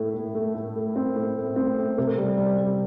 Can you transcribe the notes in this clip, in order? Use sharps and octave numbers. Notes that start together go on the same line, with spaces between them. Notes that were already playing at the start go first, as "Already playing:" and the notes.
Already playing: A2 A3 E4
A2
A3
A2
A3
C4
A2
A2
C4
A3
C3
G3
G3
G3